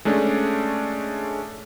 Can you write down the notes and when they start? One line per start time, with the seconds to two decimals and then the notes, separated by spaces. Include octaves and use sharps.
0.05 G#3 A3 C#4 D4